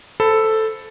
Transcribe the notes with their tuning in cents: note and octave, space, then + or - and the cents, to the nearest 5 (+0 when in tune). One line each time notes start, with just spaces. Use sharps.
A4 +0 C5 -10 B5 +10